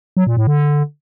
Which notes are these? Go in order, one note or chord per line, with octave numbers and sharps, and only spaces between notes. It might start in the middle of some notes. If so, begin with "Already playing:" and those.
F#3
A#2
A2
D3